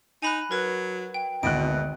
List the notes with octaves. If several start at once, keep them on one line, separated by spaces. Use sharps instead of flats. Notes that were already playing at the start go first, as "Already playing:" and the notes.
D#4 G#5 B5 F#6
F#3 A#4 B4
G5
G#1 D2 B2 F#6 D7